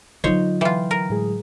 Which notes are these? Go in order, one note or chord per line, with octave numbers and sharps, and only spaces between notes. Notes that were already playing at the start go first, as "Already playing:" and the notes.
D3 F#3 D#4 F4 C5 C#5 D#5
E3 F4 G5
A#4
A2 G#3 G#4